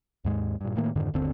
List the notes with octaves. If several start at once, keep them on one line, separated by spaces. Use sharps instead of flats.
D#2 G#2 G#3
G2 A#2
A2 D#3 A3 A#3
F2 G#2 D3 D#3
G1 D#2 D3 C4